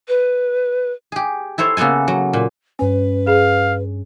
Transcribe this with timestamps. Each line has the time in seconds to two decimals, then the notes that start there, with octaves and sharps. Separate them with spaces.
0.08 B4
1.12 G4 G#4
1.58 E4 A4 C5 C#5
1.77 C#3 A#3 B3 A4 G#5
2.08 F#3
2.33 A#2
2.79 G2 C#4 B4 G#5
3.27 G#4 F5